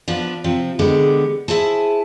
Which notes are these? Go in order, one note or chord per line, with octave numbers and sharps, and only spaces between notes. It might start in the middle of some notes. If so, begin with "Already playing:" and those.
F3 B3 D4 F4
C3 F3 C4
D3 G#3 B3 G4
E4 G#4 C5 A5